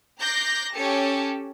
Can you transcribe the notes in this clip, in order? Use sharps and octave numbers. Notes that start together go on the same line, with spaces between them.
A#5 D6 F#6 G6 A#6 C7
C#4 G4 A4 A5 C#7